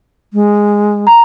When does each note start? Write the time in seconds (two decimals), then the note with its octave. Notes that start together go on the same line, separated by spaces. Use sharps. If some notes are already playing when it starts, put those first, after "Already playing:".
0.33 G#3
1.07 A#5